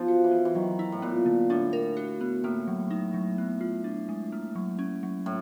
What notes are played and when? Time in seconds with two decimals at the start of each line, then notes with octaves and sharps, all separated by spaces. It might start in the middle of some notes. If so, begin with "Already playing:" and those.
Already playing: F3 B3 D#4
0.08 F#4
0.24 E3
0.32 B3
0.45 E3
0.55 D#3 F#3
0.79 E4
0.92 A2
1.02 A#2 B3
1.26 D3
1.50 A2 D4
1.73 A#4
1.97 F#4
2.21 B3
2.44 A2 A#3
2.67 F#3
2.91 D#4
3.14 F#3
3.38 B3
3.61 F4
3.84 D4
4.09 G#3
4.32 A#3
4.55 F#3
4.79 C#4
5.03 F#3
5.26 A2